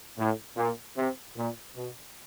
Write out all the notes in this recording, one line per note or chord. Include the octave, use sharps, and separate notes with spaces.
A2
A#2
C3
A#2
B2